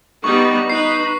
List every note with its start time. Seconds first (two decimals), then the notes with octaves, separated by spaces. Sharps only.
0.24 G3 B3 D#4 C#6
0.70 D#4 B4 C7